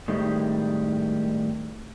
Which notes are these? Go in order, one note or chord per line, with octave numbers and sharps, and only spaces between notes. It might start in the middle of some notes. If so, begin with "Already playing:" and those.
A2 D#3 G3 G#3 C4